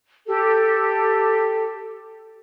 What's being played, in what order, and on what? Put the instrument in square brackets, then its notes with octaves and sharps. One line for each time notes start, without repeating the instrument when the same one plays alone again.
[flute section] G4 A4